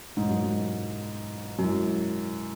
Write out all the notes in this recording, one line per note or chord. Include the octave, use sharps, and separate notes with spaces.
E2 G#2 B2 F#3 E4 C#5
F#2
G#2
F#2 B2 G#3 E4